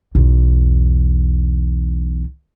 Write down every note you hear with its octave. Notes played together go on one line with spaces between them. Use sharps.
B1 E2